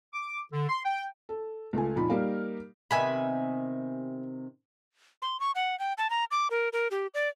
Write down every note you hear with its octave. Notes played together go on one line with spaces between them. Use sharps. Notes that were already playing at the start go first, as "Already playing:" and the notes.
D6
D3
C6
G5
A4
C#2 A3 F4 G#5
F2 A#2 D#4 B5
G3 A#3 D#4 G4 A#4 F5
C3 D#3 B3 E5 G#5 B5
C6
C#6
F#5
G5
A5
A#5
D6
A#4
A#4
G4
D5